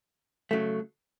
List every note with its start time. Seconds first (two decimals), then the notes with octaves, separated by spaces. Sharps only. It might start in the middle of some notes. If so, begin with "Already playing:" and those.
0.51 C#3 F#3 A3